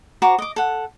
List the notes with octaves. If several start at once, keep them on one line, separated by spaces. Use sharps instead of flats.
F#4 C5 A#5 D6
D#5 D6
A4 F#5